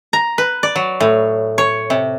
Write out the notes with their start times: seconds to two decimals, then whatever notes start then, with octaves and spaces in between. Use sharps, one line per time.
0.13 A#5
0.38 B4
0.63 D5
0.76 F#3
1.00 A2
1.58 C#5
1.90 C3